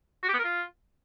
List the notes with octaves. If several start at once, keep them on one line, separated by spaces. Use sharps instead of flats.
F#4
G4
B3
A#4
F4